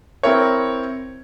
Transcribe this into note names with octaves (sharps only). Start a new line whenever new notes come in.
C4 E4 A#4 C#5